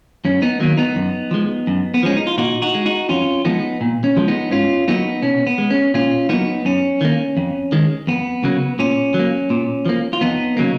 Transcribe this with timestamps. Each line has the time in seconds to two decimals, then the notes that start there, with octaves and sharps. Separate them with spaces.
0.25 F#2 C#4
0.42 B3 D#4
0.60 D#3 F#3 A#3
0.78 B3 D#4
0.96 F#2
1.31 F3 G#3
1.67 F#2
1.94 B3
2.03 F3 G#3 C#4
2.17 D#4
2.27 F4
2.38 A#2 D#4 F#4
2.62 D#4 F#4
2.74 G#3
2.86 D#4 F#4
3.09 F2 C#4 F4
3.45 F3 G#3 B3 D#4
3.81 A#2
4.04 C#4
4.17 F3 G#3
4.28 B3 D#4
4.51 G#2 C#4 F4
4.88 F#3 A#3 B3 D#4
5.23 B2 C#4
5.47 B3
5.58 G#3
5.71 C#4
5.94 A#2 C#4 F4
6.29 F#3 A#3 B3 D#4
6.65 F#2 C#4
7.01 D#3 A#3
7.37 F2
7.72 D#3 G#3
8.07 F2 B3
8.44 C#3 F#3 A#3
8.79 A#2 C#4
9.14 F#3
9.19 A#3
9.50 A#2
9.86 F3 A#3
10.13 F4
10.21 F2 B3 D#4
10.57 C#3 F#3 A#3